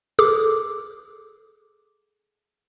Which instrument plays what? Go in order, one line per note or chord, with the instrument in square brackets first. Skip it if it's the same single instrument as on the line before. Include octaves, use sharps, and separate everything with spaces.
[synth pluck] G#4 A4 D6